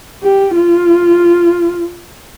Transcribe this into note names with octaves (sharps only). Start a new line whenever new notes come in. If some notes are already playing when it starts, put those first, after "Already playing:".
G4
F4